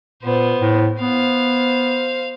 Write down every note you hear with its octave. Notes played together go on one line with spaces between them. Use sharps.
A#2 B3 C5
A2
B3 C5 F5